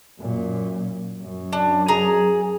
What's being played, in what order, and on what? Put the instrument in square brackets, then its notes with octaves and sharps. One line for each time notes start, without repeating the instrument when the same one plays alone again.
[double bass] F#2 A#2
F#2
[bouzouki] D4
G#4 A#5